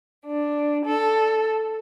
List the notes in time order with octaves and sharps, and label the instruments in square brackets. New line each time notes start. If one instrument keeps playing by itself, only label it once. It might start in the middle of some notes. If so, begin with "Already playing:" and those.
[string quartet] D4
A4